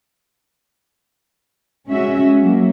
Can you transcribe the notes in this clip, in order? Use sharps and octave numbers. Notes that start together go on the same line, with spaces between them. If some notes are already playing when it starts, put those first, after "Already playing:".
G#3 C#4 F#4 E5
F#3 A#3